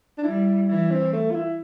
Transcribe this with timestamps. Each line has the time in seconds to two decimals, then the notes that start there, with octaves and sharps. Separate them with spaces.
0.18 D4
0.23 G3 E4
0.68 E3 E4
0.91 C4
1.13 A3
1.31 F4
1.35 E4